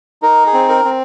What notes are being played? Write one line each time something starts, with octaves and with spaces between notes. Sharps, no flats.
D#4 A#4
G#4
C4
A#4
C4